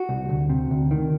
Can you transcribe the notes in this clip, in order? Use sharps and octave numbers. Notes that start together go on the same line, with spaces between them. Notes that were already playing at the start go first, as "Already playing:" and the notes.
Already playing: F#4
C2
D2
C3
D2
D#3